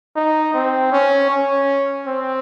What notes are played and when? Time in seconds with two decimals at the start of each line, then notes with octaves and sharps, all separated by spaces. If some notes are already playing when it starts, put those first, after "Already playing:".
0.16 D#4
0.54 C4
0.92 C#4
1.30 C#4
2.06 C4